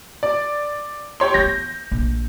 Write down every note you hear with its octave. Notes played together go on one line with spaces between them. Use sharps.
D5
G4 C#5 C6
E3 B3 G6 A#6
A#1 D3